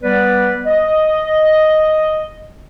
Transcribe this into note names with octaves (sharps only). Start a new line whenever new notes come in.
G3 B3 B4 D5
D#5